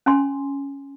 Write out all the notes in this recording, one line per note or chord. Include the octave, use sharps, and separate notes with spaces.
C#4 G#5 C6